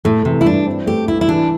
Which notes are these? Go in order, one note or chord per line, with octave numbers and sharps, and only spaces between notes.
A2 A3
C3 E3
E4
G2 D4
C4
A3 G4
C2 E4
E4
E3 D4